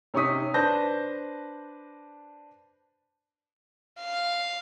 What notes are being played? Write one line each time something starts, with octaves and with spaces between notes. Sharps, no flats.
C3 C#4 D#4 C#6 D#6 B6
D4 B4 C5 A5 G6 A#6
F5